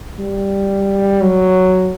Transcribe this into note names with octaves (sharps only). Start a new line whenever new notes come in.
G3
F#3